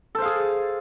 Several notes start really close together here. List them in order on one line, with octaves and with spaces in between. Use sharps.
A4 C5 F5 G#4